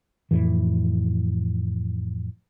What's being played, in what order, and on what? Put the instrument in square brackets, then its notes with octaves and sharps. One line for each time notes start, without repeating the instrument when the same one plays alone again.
[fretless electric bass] F2 A2 E3